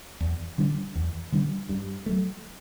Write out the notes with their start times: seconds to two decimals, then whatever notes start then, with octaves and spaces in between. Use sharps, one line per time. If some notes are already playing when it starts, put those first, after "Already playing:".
0.20 E2
0.58 D3 G3 D4
0.95 E2
1.32 D3 G3 D4
1.69 G2
2.06 F#3 A3